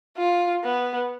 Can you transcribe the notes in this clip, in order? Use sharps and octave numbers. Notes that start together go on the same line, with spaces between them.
F4
B3